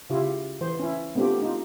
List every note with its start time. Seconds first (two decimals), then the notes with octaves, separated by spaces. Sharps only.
0.10 C#3 E4 F4 G4
0.61 E3 C5
0.79 C#4 E4
1.15 A3 B3 C4 D4 F4 G4
1.42 D#4 F4